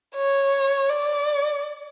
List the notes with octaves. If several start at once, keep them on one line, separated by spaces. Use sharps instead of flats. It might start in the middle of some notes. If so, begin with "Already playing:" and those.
C#5
D5